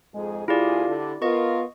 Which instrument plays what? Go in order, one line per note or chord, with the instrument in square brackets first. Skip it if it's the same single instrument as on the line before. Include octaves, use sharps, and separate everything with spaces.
[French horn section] F2 G#2 G#4 [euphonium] G#3
[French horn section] D2 G#4 [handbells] E4 G4 D5 [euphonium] F4
[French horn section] D3
[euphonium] B3 [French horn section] F4 A#4 [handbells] D#5 C#6